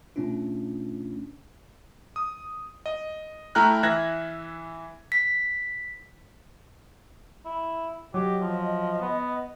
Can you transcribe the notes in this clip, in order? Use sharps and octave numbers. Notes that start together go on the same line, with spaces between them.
B2 A3 C#4 D4 F4
D#6
D#5
A3 E4 G5 A#5 F6 F#6
E3 E5 F#6 G#6 A#6
B6
E4
F#3 G4 D#5
F3
B3